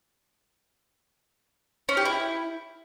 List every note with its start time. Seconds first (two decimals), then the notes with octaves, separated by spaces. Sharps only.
1.89 C#4
1.97 G4
2.05 E4